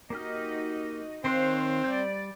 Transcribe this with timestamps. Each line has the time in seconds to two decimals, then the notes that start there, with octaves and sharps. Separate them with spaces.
0.10 A#3 D#4 F#4 G4 D#5 F6
1.24 D#3 C4 C5 C#5 F5 C6 F#6
1.84 G3 D5 G6